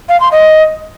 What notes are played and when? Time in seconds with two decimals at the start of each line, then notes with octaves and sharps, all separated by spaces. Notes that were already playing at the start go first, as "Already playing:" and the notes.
0.09 F5
0.20 C6
0.32 D#5